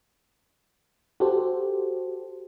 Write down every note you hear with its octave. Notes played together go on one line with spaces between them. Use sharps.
F#4 G4 A4 C5